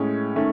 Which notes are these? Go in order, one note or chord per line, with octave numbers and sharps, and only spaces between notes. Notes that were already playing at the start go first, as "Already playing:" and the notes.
Already playing: A2 G#3 C#4
D#3 A3 C#4